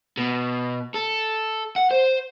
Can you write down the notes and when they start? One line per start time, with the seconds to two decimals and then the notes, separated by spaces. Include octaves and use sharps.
0.18 B2
0.94 A4
1.76 F#5
1.91 C5